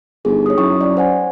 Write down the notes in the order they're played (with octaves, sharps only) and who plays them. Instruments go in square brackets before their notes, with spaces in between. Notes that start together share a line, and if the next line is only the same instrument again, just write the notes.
[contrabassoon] G1 [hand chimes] D#4 G#4
[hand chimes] C#5 D#6
[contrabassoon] F#2 [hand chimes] E4 G5 C#6
[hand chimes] D5 G5
C5 F#5 G#5